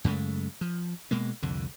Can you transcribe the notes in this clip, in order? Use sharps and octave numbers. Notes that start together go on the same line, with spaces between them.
F#2 C#3 G#3 A3
F3
B2 G#3 A#3
C2 F2 D3